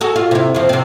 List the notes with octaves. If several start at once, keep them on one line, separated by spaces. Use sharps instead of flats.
F#4 G#4 A4
F4
C3 E4
F2 F3
C3 C4